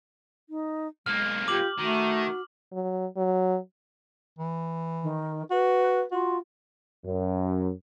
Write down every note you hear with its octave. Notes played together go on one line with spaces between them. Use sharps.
D#4
B1 G#3 A#3 F6
F4 G4 D6 F#7
D#3 A3 F#4
F#3
F#3
E3
D#3
F#4 B4
F4 F#4
F#2